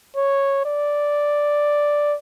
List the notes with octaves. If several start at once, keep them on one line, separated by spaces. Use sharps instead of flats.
C#5
D5